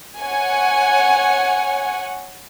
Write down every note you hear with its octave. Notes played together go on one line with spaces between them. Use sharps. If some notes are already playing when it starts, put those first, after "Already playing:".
C#5 F#5 G#5